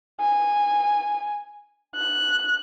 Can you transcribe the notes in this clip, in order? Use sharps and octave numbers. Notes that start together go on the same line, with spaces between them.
G#5
F#6